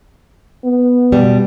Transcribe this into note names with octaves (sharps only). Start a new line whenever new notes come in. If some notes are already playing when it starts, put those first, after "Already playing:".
B3
B2 G3